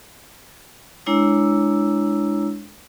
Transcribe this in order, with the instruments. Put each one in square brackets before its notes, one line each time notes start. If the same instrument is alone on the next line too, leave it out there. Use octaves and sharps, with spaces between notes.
[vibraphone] G#3 D4 E4 C#5 A#5 E6